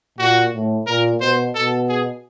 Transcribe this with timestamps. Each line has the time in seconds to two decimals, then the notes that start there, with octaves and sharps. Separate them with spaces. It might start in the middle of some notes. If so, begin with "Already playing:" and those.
0.18 A#2 F#4
0.53 A2
0.87 A#2 A#4
1.21 B2 C5
1.55 B2 A4
1.88 G#4